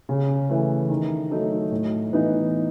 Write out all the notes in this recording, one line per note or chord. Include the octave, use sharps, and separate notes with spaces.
C#3
E3 A3
D#3
F#3 A3 D#4 A4
A2
E3 B3 D#4